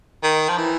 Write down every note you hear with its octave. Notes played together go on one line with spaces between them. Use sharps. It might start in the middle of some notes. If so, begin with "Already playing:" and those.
D#3
F3
E3